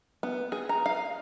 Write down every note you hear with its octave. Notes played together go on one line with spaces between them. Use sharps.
B3
G#4
A#5
F5